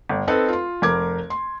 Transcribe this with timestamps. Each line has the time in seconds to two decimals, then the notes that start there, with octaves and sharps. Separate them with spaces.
0.09 G1
0.28 C4 D#4 A4 B4
0.48 F4 C6
0.82 F1 A#4 D6 G#6
1.30 C6